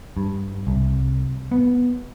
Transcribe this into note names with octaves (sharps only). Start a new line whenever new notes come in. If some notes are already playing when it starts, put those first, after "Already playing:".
G2
C2
B3